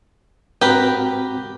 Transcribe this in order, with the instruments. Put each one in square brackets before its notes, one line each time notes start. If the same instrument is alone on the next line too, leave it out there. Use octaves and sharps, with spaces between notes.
[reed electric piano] G#2 C4 F#4 [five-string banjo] G4 A#4 B4